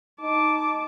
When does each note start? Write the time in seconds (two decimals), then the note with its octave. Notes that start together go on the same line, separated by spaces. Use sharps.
0.21 D#4 A5 D6